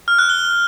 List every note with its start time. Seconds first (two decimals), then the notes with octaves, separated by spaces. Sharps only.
0.08 F6
0.19 F#6
0.29 G7